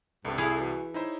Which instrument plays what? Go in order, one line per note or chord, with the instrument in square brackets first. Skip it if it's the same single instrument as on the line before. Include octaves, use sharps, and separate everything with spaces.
[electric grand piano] C2 C3 [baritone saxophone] G2 [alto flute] A4
[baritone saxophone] E4 [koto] G#4 F5
[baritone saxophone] E3 [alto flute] F#4
[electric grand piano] D#4 E4 C5 [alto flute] C#5